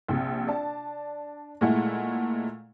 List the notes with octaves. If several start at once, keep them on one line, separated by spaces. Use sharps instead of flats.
A#1 C3
D4 A5
A#2 G#3 A3 E4 F#5